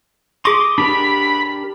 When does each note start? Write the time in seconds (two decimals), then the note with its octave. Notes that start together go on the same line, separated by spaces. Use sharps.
0.45 G#4 C6 D6 D#6 A#6
0.78 D4 G4 A#4 B5